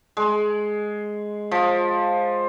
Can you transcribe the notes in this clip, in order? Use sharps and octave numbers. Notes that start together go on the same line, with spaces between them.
G#3
F3